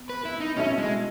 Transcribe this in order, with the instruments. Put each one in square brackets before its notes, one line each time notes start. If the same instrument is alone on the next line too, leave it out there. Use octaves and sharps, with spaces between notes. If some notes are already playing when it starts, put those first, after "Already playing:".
Already playing: [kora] B3
[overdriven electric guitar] B4
E4
D#4
[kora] B2 A3 E4 [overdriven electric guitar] C#4
[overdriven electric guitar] G#3